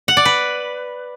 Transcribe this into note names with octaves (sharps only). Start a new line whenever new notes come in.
F#5
D5
B4